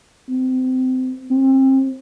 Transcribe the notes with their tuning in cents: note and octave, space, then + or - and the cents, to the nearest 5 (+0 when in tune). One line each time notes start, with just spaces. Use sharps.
C4 -25
C4 +30